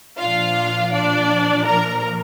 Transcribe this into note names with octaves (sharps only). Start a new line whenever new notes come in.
A#2 F3 D4 F4 F5
D4 D5
A#4 A#5